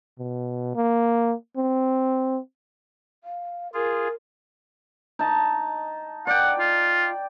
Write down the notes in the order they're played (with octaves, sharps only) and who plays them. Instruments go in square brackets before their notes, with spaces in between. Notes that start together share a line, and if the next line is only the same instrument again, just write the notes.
[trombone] B2
A#3
C4
[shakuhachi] F5
[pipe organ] F4 G#4 [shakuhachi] A#4
[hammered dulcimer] D#4 A5
[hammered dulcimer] D5 G5 [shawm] F#5
[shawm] F4